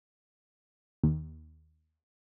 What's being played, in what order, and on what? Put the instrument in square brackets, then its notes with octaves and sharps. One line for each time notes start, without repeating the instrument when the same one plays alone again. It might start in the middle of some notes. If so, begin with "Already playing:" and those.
[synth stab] D#2